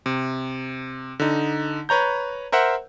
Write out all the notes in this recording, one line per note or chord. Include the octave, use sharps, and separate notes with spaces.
C3
D3 D#4
B4 C#5 A#5 G6
A#4 C5 E5 F#5